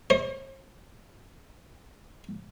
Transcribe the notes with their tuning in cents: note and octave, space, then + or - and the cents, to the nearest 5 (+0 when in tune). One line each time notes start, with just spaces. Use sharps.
C5 +45